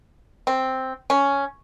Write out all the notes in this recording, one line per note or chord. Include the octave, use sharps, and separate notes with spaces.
C4
C#4